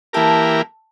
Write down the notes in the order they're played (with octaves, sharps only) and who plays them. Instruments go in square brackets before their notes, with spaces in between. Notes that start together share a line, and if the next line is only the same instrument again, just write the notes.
[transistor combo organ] E3 A#3 E4 G4 A#4 [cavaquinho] A4